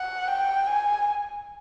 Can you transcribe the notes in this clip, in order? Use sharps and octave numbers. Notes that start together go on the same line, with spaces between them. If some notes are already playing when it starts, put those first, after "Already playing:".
Already playing: F#5
G5
G#5